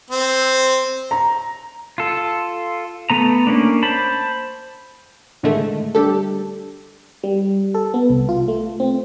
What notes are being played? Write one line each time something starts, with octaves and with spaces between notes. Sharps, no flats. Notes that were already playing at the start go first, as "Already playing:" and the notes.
C4
A#5
F4 A4
A3 B3 A#5
A#3 C#4 D4
C5 A5 B5
A2 D3 D#3 G#3 A3
G3 D4 G4 A4
G3
A4
B3
C2
F4
A3
C4